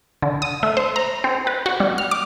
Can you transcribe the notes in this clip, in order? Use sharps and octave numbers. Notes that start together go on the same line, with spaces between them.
D3
D#6
A3
C5
A#5
C4
B4
F#4
G3
F6
D6